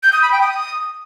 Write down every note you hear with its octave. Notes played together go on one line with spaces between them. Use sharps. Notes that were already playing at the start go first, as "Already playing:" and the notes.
G6
D#6
B5
G5
D#6